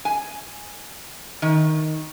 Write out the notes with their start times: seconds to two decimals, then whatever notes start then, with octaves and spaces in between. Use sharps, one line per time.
0.05 G#5
1.42 D#3